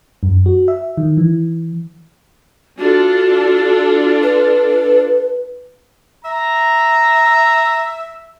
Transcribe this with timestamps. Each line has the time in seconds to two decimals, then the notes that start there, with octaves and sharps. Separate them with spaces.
0.23 F#2
0.46 F#4
0.68 E5
0.97 D#3
1.17 E3
2.78 D4 F4 F#4 A4
4.23 B4
6.25 E5 A#5